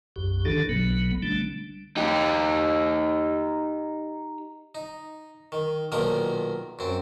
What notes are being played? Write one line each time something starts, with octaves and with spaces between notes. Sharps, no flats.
B1 F#2 G4
D3 D#3 D4 A4
B1 B2 F#3 B3
D3 G3 A3 D4
D#4 G4
D#4
D#3
B1 A#2 D#3 F3 A#4 A#5
F#2 C4